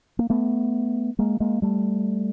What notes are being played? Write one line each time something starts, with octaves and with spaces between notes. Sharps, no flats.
A#3
A3 B3
G#3 A#3
G#3 A#3
G3 A3